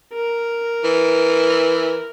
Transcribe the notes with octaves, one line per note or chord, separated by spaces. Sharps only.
A#4
E3